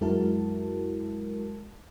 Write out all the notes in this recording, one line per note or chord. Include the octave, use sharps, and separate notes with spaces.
F#2 G#3 E4 F#4 A#4 A5